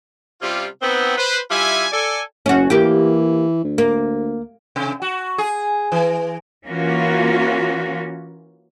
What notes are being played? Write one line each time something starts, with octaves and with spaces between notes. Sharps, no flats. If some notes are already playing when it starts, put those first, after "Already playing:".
C3 G3 C#4 F4
B3 C4 D#4
B4 C5
G3 E4 F4 E5 G#5
A4 D5 G#5
F#1 C#4 F#4
E3 A#3 G4
D2
A#3
C3
F#4
G#4
E3
E3 A#3 C#4 F4 F#4